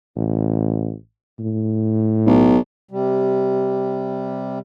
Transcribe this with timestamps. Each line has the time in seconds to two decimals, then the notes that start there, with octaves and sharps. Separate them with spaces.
0.16 A1
1.39 A2
2.26 B1
2.91 C3 G3